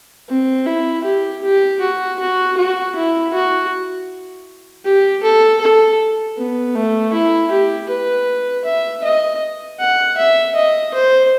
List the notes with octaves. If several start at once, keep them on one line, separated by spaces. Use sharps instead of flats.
C4
E4
G4
G4
F#4
F#4
F#4
E4
F#4
G4
A4
A4
B3
A3
E4
G4
B4
E5
D#5
F#5
E5
D#5
C5